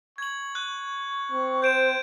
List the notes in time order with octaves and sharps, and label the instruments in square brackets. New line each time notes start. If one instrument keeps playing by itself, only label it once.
[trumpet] C#6 [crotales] G#6 F#7
[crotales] F#6
[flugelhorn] C4
[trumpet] C5 [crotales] G6 D7 E7